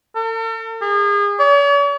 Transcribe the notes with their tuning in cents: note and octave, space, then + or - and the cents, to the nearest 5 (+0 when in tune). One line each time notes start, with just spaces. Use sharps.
A4 +45
G#4 -35
C#5 +45